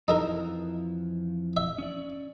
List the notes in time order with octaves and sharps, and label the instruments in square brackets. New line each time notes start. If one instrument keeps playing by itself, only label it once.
[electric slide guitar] F2 E3 F3 [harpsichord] D#4 A4 A#4
[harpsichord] E5
[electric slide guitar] C#4 D5